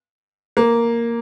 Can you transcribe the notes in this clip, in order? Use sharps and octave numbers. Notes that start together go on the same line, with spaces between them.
A#3